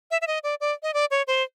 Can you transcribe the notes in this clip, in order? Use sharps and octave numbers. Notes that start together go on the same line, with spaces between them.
E5
E5
D#5
D5
D5
D#5
D5
C#5
C5